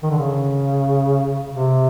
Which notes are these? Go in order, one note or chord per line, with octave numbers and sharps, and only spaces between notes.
D#3
D3
C#3
C3